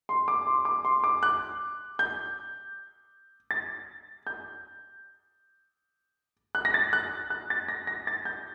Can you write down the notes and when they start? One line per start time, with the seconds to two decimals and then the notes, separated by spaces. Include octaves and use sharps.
0.09 C6
0.28 D6
0.47 C6
0.65 D6
0.85 C6
1.04 D6
1.23 F#6
1.99 G6
3.51 A6
4.27 G6
6.55 F#6
6.65 A#6
6.74 A6
6.93 F#6
7.30 F#6
7.50 A6
7.68 A#6
7.87 A#6
8.07 A6
8.25 G6